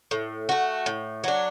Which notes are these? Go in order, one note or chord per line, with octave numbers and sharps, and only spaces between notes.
A2
A3 F#4
A2
F#3 D4